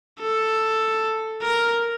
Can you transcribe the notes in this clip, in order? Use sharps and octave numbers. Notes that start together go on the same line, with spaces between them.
A4
A#4